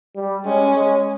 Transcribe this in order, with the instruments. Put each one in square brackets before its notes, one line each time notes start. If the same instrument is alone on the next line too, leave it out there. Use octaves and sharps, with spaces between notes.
[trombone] G3
[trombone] G#3 [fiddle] C#4
[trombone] G#3